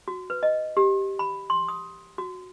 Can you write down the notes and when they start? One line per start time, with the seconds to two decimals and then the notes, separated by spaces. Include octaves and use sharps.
0.08 F#4
0.30 B4
0.43 D#5
0.77 G4
1.19 B5
1.50 C6
1.68 D#6
2.18 F#4